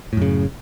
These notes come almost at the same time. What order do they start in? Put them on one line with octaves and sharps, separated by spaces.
A2 F#2 C#3